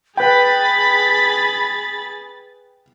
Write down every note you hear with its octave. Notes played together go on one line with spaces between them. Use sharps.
G#4 B4 G5 B5 A6